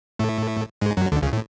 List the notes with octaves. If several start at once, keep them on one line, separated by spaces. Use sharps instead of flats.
A2 A3
G#2 G#3
F#2 F#3
D2 D3
C#2 C#3
A2